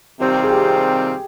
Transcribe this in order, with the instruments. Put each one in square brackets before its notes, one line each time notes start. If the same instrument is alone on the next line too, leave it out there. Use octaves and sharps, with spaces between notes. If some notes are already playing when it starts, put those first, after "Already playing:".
[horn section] C3 D#3 G3 C4 F4 [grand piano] G4
[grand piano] G#4
G4